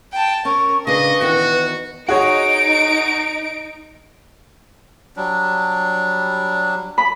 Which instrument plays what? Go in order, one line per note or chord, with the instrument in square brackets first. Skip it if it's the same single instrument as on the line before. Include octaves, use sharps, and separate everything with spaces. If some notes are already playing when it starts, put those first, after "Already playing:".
[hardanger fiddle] G5 A5
[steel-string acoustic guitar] C#4 [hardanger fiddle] A#4 [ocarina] C#6
[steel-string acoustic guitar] C#3 D4 [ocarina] B4 [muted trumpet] D#5 [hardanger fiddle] C#6
[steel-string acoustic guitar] E2 D#3 D#5 [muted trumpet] F#4
[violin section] D#4 [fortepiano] F#4 G#4 C#5 [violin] D7
[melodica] F#3 G3 D4
[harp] B5